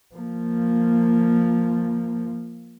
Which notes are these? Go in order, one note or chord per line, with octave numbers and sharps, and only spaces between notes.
F3 A#3